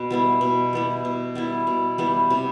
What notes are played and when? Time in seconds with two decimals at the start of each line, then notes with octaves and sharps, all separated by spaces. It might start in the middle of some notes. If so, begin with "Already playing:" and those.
Already playing: B2
0.10 G3 B3 E4
0.41 B2
0.73 G3 B3 E4
1.05 B2
1.35 G3 B3 E4
1.67 B2
1.98 G3 B3 E4
2.30 C3